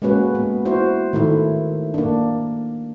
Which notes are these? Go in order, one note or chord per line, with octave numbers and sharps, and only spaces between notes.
G#3 A#3 C#4 F#4 B4
B3
E4 F#4 C5
D#3 A3 D#4 E4
A#3 D4